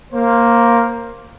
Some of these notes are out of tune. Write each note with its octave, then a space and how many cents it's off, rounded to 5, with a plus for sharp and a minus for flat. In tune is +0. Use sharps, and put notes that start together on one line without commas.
A#3 +0 C5 +20